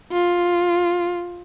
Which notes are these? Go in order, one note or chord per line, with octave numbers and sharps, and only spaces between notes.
F4